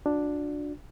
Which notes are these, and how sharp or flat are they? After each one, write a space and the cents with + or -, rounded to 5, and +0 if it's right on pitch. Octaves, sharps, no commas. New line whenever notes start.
D4 +0 F#4 -40